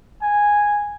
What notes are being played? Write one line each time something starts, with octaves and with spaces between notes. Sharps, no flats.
G#5